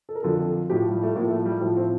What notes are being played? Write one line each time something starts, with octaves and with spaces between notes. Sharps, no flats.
A4
A#4
F2 D3 F3 A4
A2 F3 G4
G3
A3
A2 F3 A#3
A3
G3
A2 F3 A3
C4